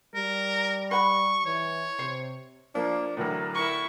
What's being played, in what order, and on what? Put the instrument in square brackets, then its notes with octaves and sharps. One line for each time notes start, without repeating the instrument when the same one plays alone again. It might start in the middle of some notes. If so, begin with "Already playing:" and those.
[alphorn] G3 [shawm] A#4
[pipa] B4 F#5 B5 [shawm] C#6
[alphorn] E3 [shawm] C#5
[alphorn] C3 [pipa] C5
[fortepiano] F3 [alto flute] A#3 [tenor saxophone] D4
[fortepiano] A2 D3 E3 [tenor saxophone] F#3 [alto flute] A#4
[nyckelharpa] E4 C#6